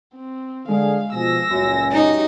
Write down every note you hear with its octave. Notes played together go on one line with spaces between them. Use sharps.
C4
D3 G#3 G#4 F5
B2 F3 G#4 E6 A#6
C#2 F#2 A#2 G#5
D#4 F#4 G4